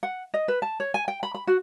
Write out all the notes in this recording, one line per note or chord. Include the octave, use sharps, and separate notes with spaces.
F#5
D#5
B4
A5
C#5
G#5
G5
B5
B5
F#4